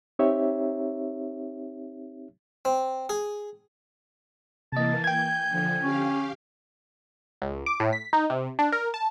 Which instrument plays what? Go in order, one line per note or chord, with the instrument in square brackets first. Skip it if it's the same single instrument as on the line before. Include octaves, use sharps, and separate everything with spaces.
[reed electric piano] C4 D#4 G4 C#5 E5
[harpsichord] C4
G#4
[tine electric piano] C3 D#5 [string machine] E3 A#3 [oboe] A5
[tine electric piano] G5 G#6 [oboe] G#5 [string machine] G6
[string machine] D3 F3
[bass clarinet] C#4 [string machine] G4 F5
[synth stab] C#2
D6
A2
B6
D#4
C3
D4
A#4
A5